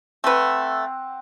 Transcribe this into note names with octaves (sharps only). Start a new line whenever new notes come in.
A3 C4 B4 F#5